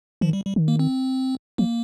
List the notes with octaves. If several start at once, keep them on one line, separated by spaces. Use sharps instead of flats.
D#3 F3
G3
G3
D#3
A#3
C4
F3 A#3